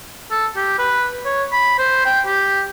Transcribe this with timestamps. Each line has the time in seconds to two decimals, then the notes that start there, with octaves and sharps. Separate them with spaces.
0.31 A4
0.56 G4
0.79 B4
1.25 C#5
1.52 B5
1.79 C5
2.06 G5
2.26 G4